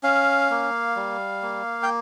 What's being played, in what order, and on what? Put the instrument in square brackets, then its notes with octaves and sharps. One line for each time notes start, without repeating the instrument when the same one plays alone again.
[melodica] C#4 F5
A#3
G3
A#3
G5